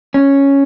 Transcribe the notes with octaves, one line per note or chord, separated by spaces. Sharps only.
C#4